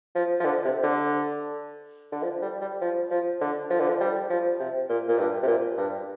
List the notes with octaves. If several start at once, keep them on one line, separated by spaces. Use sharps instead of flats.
F3
F3
D3
C3
D3
D3
F3
G3
G3
F3
F3
D3
F3
D3
F3
G3
F3
C3
A#2
A#2
G2
C3
A#2
G2